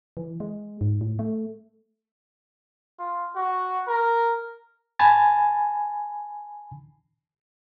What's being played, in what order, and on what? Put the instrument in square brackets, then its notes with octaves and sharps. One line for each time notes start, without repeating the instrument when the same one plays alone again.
[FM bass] E3
G#3
G#2
A2
A3
[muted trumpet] F4
F#4
A#4
[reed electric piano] G#5 A5 B5 G#6 A6